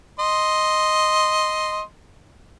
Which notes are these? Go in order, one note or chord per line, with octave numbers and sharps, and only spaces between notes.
D#5 C6